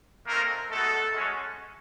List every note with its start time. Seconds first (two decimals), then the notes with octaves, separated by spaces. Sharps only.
0.27 A3 A#3 C4 D#4 A#4
0.70 G#3 A3 B3 D#4 F#4 A4
1.13 G#3 C#4 F#4